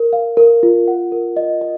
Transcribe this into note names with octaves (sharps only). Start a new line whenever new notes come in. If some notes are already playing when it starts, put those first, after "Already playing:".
Already playing: A#4
F5
A#4
F4
F#5
A#4
D#5
D#5